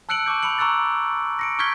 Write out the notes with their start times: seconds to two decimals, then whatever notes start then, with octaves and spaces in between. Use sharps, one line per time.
0.09 A5 E6 F#6 C#7 D7 F#7
0.26 A5 C#6 D6 G6
0.43 B5 D6 C#7 F#7
0.58 A#5 C#6 E6 F#6 A6
1.39 A#6 C#7 D7
1.59 C#6 F6 G6 G#6 B6 G7